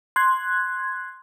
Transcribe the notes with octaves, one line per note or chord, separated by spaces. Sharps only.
C6 F#6 G#6